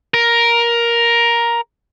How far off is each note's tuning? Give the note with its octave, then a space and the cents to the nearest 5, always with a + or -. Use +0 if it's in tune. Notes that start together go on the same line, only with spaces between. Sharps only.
A#4 +10